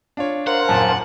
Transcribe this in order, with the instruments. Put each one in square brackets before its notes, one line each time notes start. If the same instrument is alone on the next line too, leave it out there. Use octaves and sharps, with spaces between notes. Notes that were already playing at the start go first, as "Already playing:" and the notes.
[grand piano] D4 F4 C#5
[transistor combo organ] A#4 C5 F5 [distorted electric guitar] F#5
[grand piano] D#1 F#2 G#5 [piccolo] A5